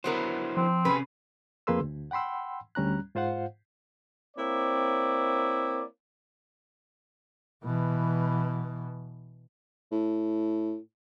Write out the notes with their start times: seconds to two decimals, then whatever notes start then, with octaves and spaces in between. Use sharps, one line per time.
0.04 D3 F#3 B3 E4 A#4 C5
0.57 F3 C4
0.85 C3 C#4 G#4 B4
1.67 F2 A#3 G#4 B4 C6 E6
1.80 D2
2.11 F#5 G5 B5 C6 E6
2.75 D2 G3 C#4 A#5 F#6
3.15 G#2 F4 C5 F5 F#5
4.37 A#3 C4 E4 C#5 D5
7.64 B2 E3
9.92 A2